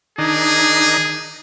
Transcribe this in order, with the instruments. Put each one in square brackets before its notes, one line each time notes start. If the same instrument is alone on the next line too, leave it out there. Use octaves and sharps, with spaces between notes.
[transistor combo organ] D#3 D4 D#4 [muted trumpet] G#4